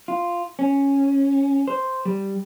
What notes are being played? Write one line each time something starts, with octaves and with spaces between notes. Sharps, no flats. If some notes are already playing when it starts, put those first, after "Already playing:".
F4
C#4
C5
G3